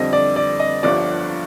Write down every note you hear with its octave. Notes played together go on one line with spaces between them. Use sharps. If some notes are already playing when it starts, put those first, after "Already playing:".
Already playing: F2 D3 G3 C4 D#5
D5
D5
D#5
G1 G2 D3 F3 D5